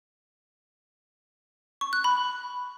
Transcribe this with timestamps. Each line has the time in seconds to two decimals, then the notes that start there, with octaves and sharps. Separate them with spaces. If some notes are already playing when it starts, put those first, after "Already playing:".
1.81 C#6
1.93 F#6
2.04 B5